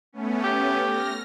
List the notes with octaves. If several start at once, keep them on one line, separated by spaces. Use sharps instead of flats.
A3 B3 C#4
G4
F6 A#6